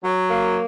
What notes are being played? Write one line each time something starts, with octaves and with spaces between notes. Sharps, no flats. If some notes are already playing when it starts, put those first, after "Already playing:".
F#3
A#3